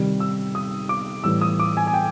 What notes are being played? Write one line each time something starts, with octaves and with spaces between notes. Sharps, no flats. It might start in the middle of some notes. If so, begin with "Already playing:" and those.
Already playing: C3 D#3 G3
E6
D#6
D6
A2 E3 G3 E6
D#6
D6
G#5
G#5
G5